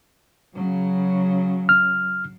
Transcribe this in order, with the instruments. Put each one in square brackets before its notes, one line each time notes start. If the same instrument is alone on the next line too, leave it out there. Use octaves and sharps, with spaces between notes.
[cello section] C#3 F#3
[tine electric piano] F6